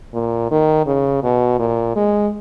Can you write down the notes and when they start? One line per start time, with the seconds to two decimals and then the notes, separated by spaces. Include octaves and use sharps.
0.14 A#2
0.51 D#3
0.86 C#3
1.23 B2
1.59 A#2
1.96 G#3